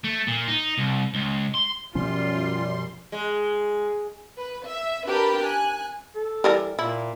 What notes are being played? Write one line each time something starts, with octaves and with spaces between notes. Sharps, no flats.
A3
A#2
D#4
C2
C#2
C6
F#2 B2 F3 G3 C#4 F4 C6
G#3
B4
E5
D4 G4 A#4 B4 B5
G#5 F#6
A4
E3 G3 A#4
A#2 E4